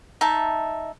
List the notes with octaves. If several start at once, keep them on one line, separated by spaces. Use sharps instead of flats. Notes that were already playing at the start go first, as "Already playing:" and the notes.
D#4 E5 A5